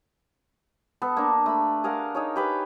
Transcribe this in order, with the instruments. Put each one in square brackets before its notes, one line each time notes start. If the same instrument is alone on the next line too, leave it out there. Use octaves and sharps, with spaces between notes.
[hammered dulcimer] B3 A4
A#3 D4
A3 B5
G#4 A#4 F5 F#5
D#4 G#4 C#5
G4 B4 G5